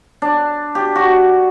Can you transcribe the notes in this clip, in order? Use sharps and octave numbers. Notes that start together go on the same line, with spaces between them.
D4
G4
F#4